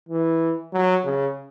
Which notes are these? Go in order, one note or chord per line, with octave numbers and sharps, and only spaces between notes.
E3
F#3
C#3